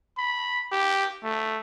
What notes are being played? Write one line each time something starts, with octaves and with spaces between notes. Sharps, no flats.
B5
G4
A3